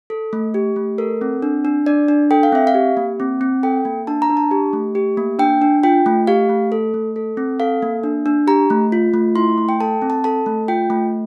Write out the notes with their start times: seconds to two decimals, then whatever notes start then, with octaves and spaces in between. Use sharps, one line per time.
0.10 A4
0.33 A3
0.54 G4
0.76 A3
0.98 A4 A#4
1.21 C4
1.42 D4
1.65 D4
1.86 D4 D5
2.08 D4
2.31 A4 G5
2.43 F5
2.52 C4 E5
2.67 F5
2.74 G4
2.97 A#3
3.20 C4
3.41 C4
3.63 A4 G5
3.85 A#3
4.07 D4 A5
4.22 A#5
4.30 D4
4.37 A5
4.51 G4
4.73 A3
4.95 G4
5.17 A#3
5.39 D4 G5
5.62 D4
5.83 F4 G5
6.06 A3
6.27 G4 F5
6.49 A3
6.72 A4
6.94 A3
7.16 A4
7.37 C4
7.60 A4 F5
7.82 A#3
8.03 D4
8.26 D4
8.47 G4 A#5
8.70 A3
8.92 F4
9.14 A3
9.36 E4 C6
9.58 A3
9.69 G5
9.80 A4 A5
10.02 C4
10.10 A5
10.24 A4 A5
10.46 A3
10.68 F4 G5
10.90 A3